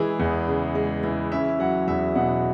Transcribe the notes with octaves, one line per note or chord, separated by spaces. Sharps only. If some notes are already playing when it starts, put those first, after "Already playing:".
Already playing: E3 G#3 G#4
E2
C#3
G#3
E3
C#4 E5
F#3 F#5
E2 E5
B2 F#5